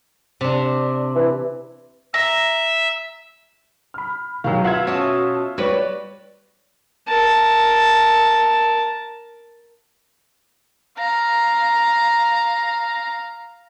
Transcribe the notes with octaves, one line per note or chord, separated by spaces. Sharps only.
C3 D4
E3
E5 A#5
B5 F6
B2 D#3 F#3 G4 F5
F4 E5 F#5 G#6
C#4 F#4 A5 D#6
G3 F#4 B4 C#5 D5
A#4 A5
F5 A#5